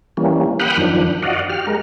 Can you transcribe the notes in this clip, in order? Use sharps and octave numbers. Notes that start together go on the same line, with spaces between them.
E3 G3 A#3 C#4
F#5 G5 B5 D#6 F6 F#6
F#2 D#3 F3 D4
F#4 D5 D#5 F5 F#5
G4 F6
G#3 A#4